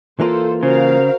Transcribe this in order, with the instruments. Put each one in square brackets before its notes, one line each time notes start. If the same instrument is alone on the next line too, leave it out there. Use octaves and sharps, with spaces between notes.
[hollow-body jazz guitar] E3 A#3 F4 [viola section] A4 C5
[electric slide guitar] C#3 [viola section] F#4 A#4 F5 [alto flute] C5